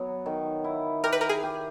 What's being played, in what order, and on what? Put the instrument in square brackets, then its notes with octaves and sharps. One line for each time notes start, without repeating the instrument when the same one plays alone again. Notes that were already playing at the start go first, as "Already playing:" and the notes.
Already playing: [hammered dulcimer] F#3 B3
D#3
E4
[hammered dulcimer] G4 [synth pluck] A#4
[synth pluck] B4
A#4
G#4
[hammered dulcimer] G4